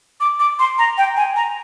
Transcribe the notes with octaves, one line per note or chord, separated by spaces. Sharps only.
D6
D6
C6
A#5
G5
G#5
A#5